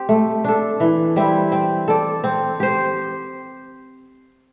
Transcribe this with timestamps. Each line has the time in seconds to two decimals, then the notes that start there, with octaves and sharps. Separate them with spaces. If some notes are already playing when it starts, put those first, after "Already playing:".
Already playing: C4 G4
0.09 A3
0.44 D4 A4
0.80 E3
1.16 G3 C4 E4
1.52 C4
1.88 A4 D5
2.24 C4
2.60 G4 C5